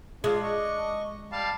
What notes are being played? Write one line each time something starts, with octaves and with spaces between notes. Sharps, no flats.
G#3 D4 F4
D#5 C#6
G3 F5 A5